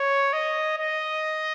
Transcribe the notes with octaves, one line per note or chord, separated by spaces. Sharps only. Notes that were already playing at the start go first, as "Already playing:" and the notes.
Already playing: C#5
D#5
D#5